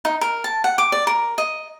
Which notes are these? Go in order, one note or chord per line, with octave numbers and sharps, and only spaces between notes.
D#4
A#4
A5
F#5
D6
D5
A#4
D#5